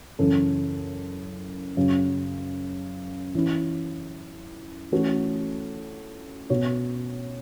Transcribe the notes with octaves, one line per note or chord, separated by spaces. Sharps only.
F#2 C#3 E3 C#4 A4
F#2 C#3 F#3
E3 C#4 E4
E3 A3 C#4 F#4 A4
B2 B3 F#4 C#5